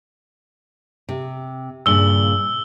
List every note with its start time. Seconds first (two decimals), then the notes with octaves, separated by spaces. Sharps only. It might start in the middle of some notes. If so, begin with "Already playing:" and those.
1.09 C3
1.86 G2 A#2 C#3 E6 G7